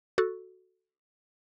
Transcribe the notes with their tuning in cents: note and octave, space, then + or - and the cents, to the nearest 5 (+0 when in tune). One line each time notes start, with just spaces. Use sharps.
F#4 +0 A4 +0